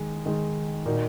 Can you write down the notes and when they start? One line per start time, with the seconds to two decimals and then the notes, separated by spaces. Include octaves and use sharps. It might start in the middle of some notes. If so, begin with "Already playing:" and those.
Already playing: D#3 G#3 D#4
0.26 D#3 G#3 D#4
0.86 A#2 A#3 D#4 F#4